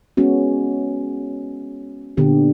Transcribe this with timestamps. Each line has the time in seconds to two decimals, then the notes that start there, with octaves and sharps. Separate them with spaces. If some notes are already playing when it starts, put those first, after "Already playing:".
0.17 G#3 B3 C#4 F#4
2.17 A#2 D3 B3 G4